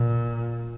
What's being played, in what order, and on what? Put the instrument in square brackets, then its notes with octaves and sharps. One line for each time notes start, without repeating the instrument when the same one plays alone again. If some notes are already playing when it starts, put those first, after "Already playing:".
Already playing: [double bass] A#2